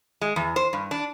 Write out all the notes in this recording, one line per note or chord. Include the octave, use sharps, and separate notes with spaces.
G#3
E2
C5
G2
D4